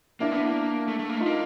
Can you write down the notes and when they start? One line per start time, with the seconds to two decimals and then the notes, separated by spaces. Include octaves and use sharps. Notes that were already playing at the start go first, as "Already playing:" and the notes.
0.20 A#3 D4 E4
0.31 B3
0.44 A#3
0.88 A3
0.99 A3
1.09 A#3
1.18 A3 D#4 F4
1.26 A#3